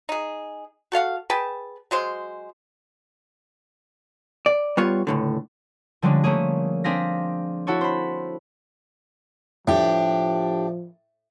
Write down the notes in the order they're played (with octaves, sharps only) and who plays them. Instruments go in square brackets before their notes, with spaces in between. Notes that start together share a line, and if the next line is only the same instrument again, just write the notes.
[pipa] D#4 G#4
F#4 A4 F5 F#5
G#4 B4 G5 A5
F#3 G#3 C5
[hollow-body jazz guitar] D5
G3 B3 F4 C#5
C#2 A2 D3
[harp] D3 F3 G3 G#3 C#4 D4
A3 A#3 C#4 G#4
C4 D4 G#4 F5 A#6 B6
E4 F#4 A4 C#5
C5 B5
[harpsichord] A2 [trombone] F3 [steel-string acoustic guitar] D4 G4